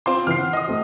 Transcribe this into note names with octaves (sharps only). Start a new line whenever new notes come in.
C4 F4 C6
C#3 E3 C4 F6 C7
F#5
D#5 D#6
A3 C4 F#4